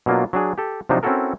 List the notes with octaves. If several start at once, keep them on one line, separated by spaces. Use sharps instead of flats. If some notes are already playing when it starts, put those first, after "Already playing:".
B2 F#3 A#3 D4 F4
F#3 D4 G#4
G4 A4
C3 F3 F#3 D4 D#4 C5
C4 C#4 E4 F#4 A4 A#4